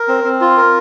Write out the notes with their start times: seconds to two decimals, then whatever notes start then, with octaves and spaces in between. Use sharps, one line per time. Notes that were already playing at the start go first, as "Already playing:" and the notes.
Already playing: A#4
0.08 C4
0.24 C4
0.41 F4
0.57 A#4